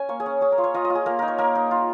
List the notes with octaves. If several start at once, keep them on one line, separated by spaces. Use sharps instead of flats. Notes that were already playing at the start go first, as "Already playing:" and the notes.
Already playing: C#4 G#5
A#3 C#5
G#4
C#4
C#4 G#4
A#4
F4
C#5
F4 D#5
D#5
F4
G#4
A#3 A#4
D#4 A#4
C#5
A#3 A#4
D#4
F4